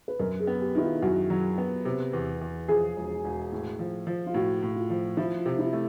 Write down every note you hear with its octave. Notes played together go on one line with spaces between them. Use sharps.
B4
F#2 A#4
G#4
B3
G4
D#3 E4
F4
F#2 F#4
F#3
B3
C3
E2
E2
F3 G#4
E1
E1
A2
F3
F3
F4
A2 F#4
A2
F4
F3
F3 E4
F4
C3
E4
A3